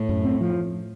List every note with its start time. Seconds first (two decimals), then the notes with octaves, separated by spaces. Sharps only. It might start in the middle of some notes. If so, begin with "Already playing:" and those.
Already playing: A2
0.09 F#2
0.24 C4
0.41 F3